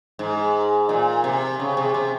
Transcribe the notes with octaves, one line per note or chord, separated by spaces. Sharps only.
G#2
A#2
C3
C#3
C3
C3